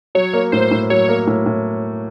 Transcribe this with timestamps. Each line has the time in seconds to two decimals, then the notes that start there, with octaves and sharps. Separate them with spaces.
0.15 F#3 C#5
0.33 A#3
0.52 A2 C5
0.71 A2
0.90 F#3 C#5
1.09 A#3
1.27 A2
1.46 A2